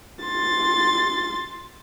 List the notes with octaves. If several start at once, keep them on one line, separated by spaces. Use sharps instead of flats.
C6 A6